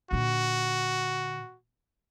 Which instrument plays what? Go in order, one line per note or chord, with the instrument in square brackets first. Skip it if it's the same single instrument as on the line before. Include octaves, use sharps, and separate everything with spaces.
[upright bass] A#2 D3 [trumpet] F#4